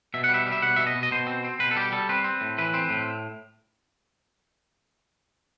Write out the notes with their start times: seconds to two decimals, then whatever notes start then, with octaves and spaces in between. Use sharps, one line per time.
0.14 B2 E5
0.24 F#5
0.29 G3
0.34 E5
0.47 G3
0.52 E5
0.62 B2 F#5
0.76 B2 E5
0.87 D#5
0.95 B2
1.03 D#5
1.12 B2 C5
1.27 C4
1.44 C4
1.59 B2 B4
1.71 A4
1.76 G3 G4
1.92 G3 A4
2.09 C4 B4
2.24 C4
2.41 A2
2.58 E3 B4
2.74 C4
2.90 A2